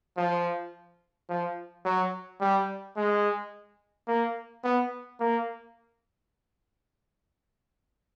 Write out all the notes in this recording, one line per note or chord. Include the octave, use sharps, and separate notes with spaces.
F3
F3
F#3
G3
G#3
A#3
B3
A#3